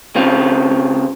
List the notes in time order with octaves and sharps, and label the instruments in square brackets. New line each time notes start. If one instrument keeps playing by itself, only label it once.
[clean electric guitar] C#3 C4 F4